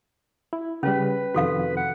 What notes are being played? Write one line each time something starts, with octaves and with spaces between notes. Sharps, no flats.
E4
C#3 G3 C#4 B4
F2 C3 D#3 F#4 A4 F5
F#5